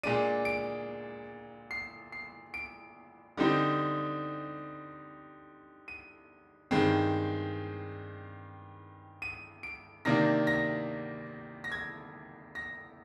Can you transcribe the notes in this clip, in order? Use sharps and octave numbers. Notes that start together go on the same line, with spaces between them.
A#2 G#3 D4 D#7
D7
C7
C7
D7
D3 G3 C4 D#4
D#7
G2 D#3 G#3 C4
D#7
D7
C3 D#3 A#3 D4 A#6
A#6
A#6
G#6
A#6